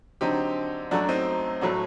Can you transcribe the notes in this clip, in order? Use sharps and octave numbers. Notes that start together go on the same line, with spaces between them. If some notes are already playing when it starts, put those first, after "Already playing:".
D3 F#3 C4 D#4 G4
F#2 F#3 A3 D4 F#4
C4 D#4
A2 F#3 A3 D4 F#4